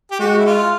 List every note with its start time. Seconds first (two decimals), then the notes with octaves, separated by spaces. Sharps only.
0.11 G4
0.19 G#3 F#4
0.38 E4
0.46 F4